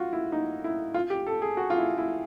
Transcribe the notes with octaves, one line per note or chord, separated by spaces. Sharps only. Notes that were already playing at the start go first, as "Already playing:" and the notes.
Already playing: F4 F#4
E4
D#4
E4
F4
G4
A4
G#4
F#4
F4
E4
E4